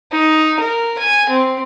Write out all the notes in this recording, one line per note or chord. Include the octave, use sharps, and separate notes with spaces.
D#4
A#4
G#5
C4